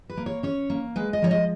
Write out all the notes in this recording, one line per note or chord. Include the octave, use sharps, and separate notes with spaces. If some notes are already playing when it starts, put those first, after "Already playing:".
B4
A#3
C#5
C#4 C#5
A#3
G#3 B4
D#5
F3 C#5
D#5